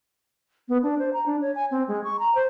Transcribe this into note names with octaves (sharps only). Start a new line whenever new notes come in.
B3
D4
C5
A#5
D4
C#5
G#5
C4
G#3
C#6
A#5
C5